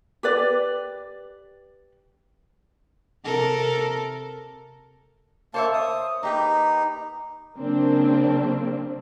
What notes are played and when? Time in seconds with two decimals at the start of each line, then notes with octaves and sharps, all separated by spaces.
0.23 G4 B4 D5
3.24 C3 A4 A#4
5.54 A#3 C5 C#5 E5 A5
5.73 D#6
6.23 A#3 D#4 G4 B4
7.57 C#3 F#3 A#3 C4 D4